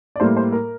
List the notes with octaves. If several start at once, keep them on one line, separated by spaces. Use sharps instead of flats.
D5
A2 G3 A#3 C5
C5
A#4